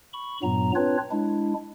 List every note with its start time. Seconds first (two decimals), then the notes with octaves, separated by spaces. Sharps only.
0.13 B5 C#6
0.43 G2 A#2 F#3 B3 A#5
0.76 C4 D4 F4 B4 C#5
1.11 G#3 D4 E4